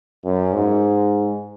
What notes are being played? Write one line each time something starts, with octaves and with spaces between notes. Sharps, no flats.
F#2
G#2